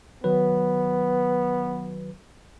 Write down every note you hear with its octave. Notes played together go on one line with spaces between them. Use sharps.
D#3 F#3 B3 B4